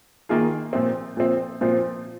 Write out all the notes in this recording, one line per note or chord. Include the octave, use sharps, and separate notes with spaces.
D#3 A#3 F4 G#4
A#2 F3 C4
A#2 F3 C4
A#2 F3 C4 F4 C5